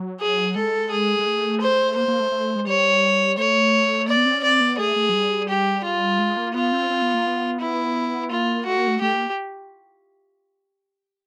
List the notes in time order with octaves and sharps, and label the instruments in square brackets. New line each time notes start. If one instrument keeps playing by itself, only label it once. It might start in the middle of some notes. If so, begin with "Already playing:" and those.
Already playing: [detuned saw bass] F#3
[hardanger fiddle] G#4
[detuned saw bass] G#3 [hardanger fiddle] A4
[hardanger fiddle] G#4
[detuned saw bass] G#3
A3
[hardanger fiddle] C5
[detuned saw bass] A#3 [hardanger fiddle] C5
[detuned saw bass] A#3
A3
A3
G#3
[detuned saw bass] G3 [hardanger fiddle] C#5
[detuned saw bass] A3 [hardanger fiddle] C#5
[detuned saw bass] A#3 [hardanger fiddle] D5
[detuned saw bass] B3
C4
C#4
[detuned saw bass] C4 [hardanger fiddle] D5
[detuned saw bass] B3
[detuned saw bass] A3 [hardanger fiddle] G#4
[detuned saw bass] A3
F#3
G3
[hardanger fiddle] G4
F4
[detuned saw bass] G#3
A#3
[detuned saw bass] B3 [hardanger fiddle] F4
[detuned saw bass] C4
C4
B3
A#3
B3
[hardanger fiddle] E4
[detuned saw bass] A#3 [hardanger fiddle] F4
[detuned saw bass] A3 [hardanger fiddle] F#4
[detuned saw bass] A#3
A3
[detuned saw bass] A3 [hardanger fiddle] G4
[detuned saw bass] A#3